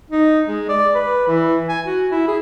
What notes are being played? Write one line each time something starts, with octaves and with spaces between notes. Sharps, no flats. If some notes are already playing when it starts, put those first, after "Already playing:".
D#4
G#3
D5
B4
E3
G#5
F#4
E4
G#4